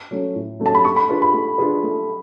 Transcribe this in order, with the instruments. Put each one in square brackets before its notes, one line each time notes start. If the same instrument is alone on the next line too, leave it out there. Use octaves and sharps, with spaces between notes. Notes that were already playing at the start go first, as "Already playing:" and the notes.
[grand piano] F#3 A3 C#4
A2
F#3 A3 C#4
[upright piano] A5
B5
[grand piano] A3 [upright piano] C#6
[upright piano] B5
[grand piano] D4 F4 G#4 B4
[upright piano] B5
[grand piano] A3
D4 F4 G#4 B4
A3